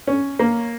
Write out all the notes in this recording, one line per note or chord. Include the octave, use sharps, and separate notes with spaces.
C#4
A#3